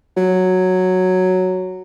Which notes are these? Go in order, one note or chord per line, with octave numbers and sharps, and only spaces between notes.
F#3